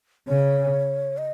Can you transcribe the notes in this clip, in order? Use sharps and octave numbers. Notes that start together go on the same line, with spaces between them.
C#3 C#5
D#5